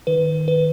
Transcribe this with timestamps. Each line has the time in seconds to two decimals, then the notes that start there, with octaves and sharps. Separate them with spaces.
0.07 D#3 B4
0.48 B4